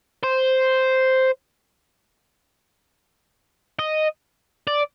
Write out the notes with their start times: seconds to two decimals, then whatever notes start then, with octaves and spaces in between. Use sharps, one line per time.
0.23 C5
3.79 D#5
4.67 D5